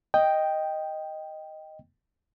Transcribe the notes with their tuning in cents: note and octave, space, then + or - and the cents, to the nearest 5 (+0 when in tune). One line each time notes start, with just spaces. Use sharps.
D#5 +0 G5 +0